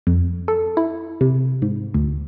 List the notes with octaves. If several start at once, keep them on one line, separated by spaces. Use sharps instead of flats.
F2
A4
E4
C3
G#2
D2